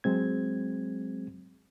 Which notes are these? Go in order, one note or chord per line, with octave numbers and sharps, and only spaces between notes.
F#3 G#3 C4 G#6